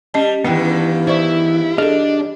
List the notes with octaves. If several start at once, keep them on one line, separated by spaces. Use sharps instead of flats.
G3 C#4 D#5 A5
E2 G2 D#3 E3 B3 C#4 G5
E4 C5 D5 C#6
D4 G#4 A4 D#5